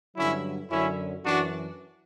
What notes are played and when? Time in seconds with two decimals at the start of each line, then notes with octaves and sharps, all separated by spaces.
0.16 G2 D3 F#3 C#4 E4
0.71 F#2 D3 F#3 C#4 E4
1.25 F#2 E3 D4 F#4